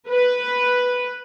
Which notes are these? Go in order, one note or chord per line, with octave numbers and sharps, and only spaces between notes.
B4